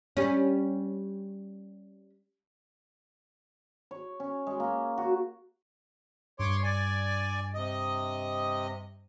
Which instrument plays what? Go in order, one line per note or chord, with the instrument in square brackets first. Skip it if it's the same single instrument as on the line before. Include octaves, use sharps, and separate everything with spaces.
[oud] G3 C#4
[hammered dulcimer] C#5
C#4
G#3
A#3
F#4
[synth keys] G2 [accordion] C#5 C6 D6
[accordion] D5 G#5
C3 D#5